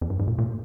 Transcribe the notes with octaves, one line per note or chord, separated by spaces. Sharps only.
F2
G2
G#2
A#2
A#2